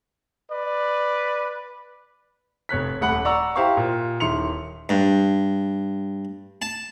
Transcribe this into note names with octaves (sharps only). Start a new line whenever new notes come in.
B4 D5
F1 C#5 F#6 B6
D#1 A3 F#5 B5 F#6 F#7
D5 F#5 A#5 C#6 E6
E4 G4 C5 F5 A#5 C#6
A#2
D#1 D#3 E4 C6 C#7 F7
G2
A5